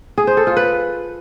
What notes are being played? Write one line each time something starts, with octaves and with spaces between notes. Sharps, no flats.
G#4
C5
A4
F4
B4